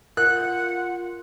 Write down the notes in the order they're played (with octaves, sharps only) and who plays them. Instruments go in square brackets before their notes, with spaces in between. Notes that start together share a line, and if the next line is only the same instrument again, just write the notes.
[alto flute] F4 [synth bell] A#4 [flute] F#5 [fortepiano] F#6